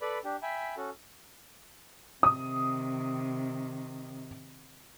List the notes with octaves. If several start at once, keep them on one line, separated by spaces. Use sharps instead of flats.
A4 B4 D5 B5
D4 G4
E5 G5 G#5 B5
C#4 F#4 A4
C3 D#3 D#6